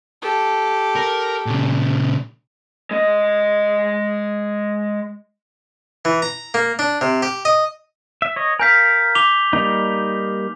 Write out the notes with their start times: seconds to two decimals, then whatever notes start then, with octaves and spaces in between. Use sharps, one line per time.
0.22 G4 A4
0.96 A#4
1.46 A#2 C#3
2.91 G#3 D#5
6.05 E3
6.22 A#5
6.54 A#3
6.79 D4
7.01 C3
7.22 G4
7.45 D#5
8.22 E5
8.36 C#5 D#5
8.59 A#4 F5 G#5 G6 B6
9.15 D6 F7 G7
9.53 G3 A#3 D#4